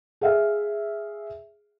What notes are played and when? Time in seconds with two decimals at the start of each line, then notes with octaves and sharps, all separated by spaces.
0.21 G#4 E5 F5